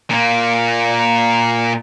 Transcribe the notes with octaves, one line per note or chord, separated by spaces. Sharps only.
A#2 A#3